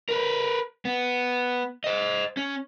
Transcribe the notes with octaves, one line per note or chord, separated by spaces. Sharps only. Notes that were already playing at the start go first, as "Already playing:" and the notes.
A#4 B4
B3
C5 D#5
C#4